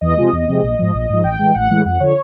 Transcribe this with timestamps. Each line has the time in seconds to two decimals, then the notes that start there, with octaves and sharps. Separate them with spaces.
0.01 E2 D#5
0.17 C3 F3 G#3
0.33 E2
0.48 C3 F3 G#3
0.62 A#1
0.79 G#2 F3
0.94 A#1
1.09 G#2 F3
1.24 A1 G5
1.39 A2 E3 G#3
1.54 A1 F#5
1.70 A2 E3 G#3
1.85 F2 F#5
2.00 D3 F3 C#5